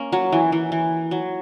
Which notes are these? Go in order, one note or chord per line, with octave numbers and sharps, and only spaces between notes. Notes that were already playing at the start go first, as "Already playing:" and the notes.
Already playing: A#3 C#4
F#3
E3
E3
E3
F#3